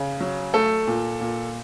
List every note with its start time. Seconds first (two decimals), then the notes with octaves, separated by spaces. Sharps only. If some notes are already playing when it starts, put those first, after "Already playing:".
Already playing: C#3
0.21 F#3
0.54 A3 A4
0.87 A#2
1.21 A#2